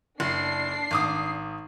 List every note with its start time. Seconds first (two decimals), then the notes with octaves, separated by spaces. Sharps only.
0.20 F#1 D4 C7
0.91 G#1 D6 D#6